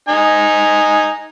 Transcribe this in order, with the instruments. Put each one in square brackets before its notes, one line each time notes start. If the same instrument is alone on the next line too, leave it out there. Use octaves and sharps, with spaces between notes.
[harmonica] D#4 G#5